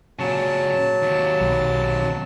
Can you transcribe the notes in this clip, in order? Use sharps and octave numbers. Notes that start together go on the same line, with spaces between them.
A#2 C#3 F#3 A5
D#2 C3
B1